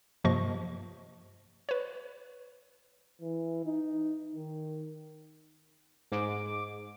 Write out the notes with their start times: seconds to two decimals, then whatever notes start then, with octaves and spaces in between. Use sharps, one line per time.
0.24 G2 C3 F3 A#3 D#5 C#6
1.69 B4 C#5
3.22 E3
3.66 D#4
4.35 D#3
6.12 G#2 D6